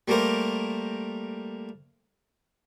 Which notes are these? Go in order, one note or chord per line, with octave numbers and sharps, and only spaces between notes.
G3 A3 A#3 G4 A#4 C5